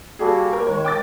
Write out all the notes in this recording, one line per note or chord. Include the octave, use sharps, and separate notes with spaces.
G3 A#3 F#4 G#4 A4
A#4
D#3 G#3 C#5
G5 D6 A6